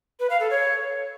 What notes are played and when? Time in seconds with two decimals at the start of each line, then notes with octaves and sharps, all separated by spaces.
0.19 B4
0.30 F5
0.40 A4
0.50 C#5